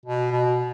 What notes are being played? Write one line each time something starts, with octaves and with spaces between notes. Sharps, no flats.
B2
B2